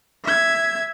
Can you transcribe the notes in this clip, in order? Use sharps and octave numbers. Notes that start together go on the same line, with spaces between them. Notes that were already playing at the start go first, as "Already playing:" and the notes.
E5 G#6